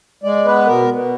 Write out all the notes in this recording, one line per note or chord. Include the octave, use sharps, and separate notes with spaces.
G#3 D5
B3 B4
B2 A#4
B2